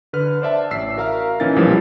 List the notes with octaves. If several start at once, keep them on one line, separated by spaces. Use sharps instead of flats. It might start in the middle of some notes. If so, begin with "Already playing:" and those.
D3 B4 F6
C5 D5 E5 A5
A1 E6 B6 C7
F#4 A#4 E5 F5 A#5 F6
A#2 E3 C#4 D#4 A#4 A6
B1 A#2 E3 F3 G3 G#3